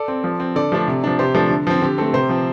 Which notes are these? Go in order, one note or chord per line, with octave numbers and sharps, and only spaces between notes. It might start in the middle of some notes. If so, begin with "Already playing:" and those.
Already playing: A4 D5
C4
F3
C4
D3 A4 D5
F3 A3 D4
C3
F3 D4
C3 G4 C5
F3 A3 D4
D3
F3 C4
D3 G4
A3 C4 A4
C3 G4 C5
F3 C4